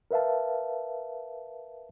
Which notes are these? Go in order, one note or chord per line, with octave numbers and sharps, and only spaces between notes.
A#4 B4 E5 F5 A5